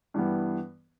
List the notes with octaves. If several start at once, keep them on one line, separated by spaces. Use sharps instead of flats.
G2 E3 G3 B3